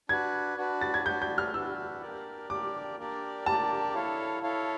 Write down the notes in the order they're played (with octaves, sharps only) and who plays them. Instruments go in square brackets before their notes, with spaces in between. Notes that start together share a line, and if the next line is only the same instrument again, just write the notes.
[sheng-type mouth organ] D4 F#4 B4 [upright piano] G#6
[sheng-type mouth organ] D4 F#4 B4
[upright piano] A6
G#6
[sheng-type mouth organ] D4 F#4 B4 [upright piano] G6
[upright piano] G6
F6
[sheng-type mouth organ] D4 F#4 B4 [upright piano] E6
[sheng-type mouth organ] A#3 D4 G4 A#4 D5
[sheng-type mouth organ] A#3 D4 G4 A#4 D5 [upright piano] D6
[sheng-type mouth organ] A#3 D4 G4 A#4 D5
[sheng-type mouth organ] A#3 D4 G4 A#4 D5 [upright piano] A5
[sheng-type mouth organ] E4 A4 C#5 F5
E4 A4 C#5 F5